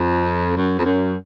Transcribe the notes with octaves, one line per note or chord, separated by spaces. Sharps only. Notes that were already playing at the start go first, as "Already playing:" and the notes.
Already playing: F2
F#2
F2
F#2